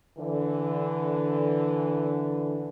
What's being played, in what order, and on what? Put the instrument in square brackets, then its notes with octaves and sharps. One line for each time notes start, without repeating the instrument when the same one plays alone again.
[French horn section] D3 E3